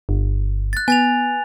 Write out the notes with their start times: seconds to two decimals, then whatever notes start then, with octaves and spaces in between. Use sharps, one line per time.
0.09 G1
0.73 F#6 A6
0.88 B3 G#5 A6 F7